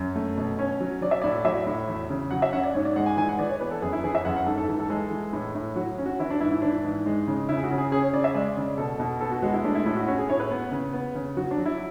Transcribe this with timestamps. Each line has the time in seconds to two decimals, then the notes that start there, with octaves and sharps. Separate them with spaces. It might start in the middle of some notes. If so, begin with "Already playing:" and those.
Already playing: F#2
0.16 A3
0.37 B2
0.59 C#4 C#5
0.80 F#3
1.01 F#3 D5
1.11 E5
1.22 A2 D5
1.45 F#3 E5
1.67 A2
1.88 E2
2.10 C#3
2.31 F#3 F#5
2.42 E5
2.53 C#4 F#5
2.63 D5
2.74 G#2 C#5
2.85 D5
2.96 G#3 F#5
3.06 G#5
3.17 E3 G#5
3.29 F#5
3.39 E3 D5
3.49 C#5
3.61 B3 B4
3.71 A4
3.82 F#2 G#4
3.92 E4
4.04 E3 G#4
4.15 E5
4.25 F#2 F#5
4.36 F#5
4.46 G#2 A4
4.58 A4
4.68 E3 A4
4.80 A4
4.90 G#3 A4
5.11 E3
5.33 A2
5.55 A2
5.76 F#3 F#4
5.98 C#4
6.06 F#4
6.19 E3 E4
6.30 D4
6.40 G#2 E4
6.52 E4
6.62 E3 D4
6.84 G#2
7.06 G#3
7.27 C#3
7.49 C#3 E4
7.57 G#4
7.63 F#4
7.71 C#3
7.78 G#4
7.92 C#4 G#4
8.02 C#5
8.13 C#3 D5
8.24 E5
8.35 G#3 D5
8.57 C#3
8.78 B2 A4
9.00 B2
9.21 B3 A4
9.31 F#4
9.42 G#3 F#4
9.54 E4
9.64 A3 D4
9.75 E4
9.85 A2 E4
9.96 F#4
10.07 C#4 F#4
10.18 G#4
10.29 A2 C#5
10.40 B4
10.51 B3
10.72 C#3
10.93 B3
11.15 C#3
11.37 F#3 F#4
11.51 D4
11.58 F#3
11.66 E4